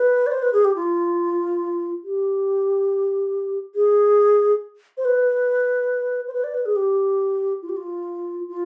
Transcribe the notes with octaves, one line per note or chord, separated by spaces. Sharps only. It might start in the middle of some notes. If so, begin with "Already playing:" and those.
Already playing: B4
D5
C5
B4
G#4
G4
F4
G4
G#4
C5
B4
C5
B4
D5
B4
G#4
G4
F4
G4
F4
F4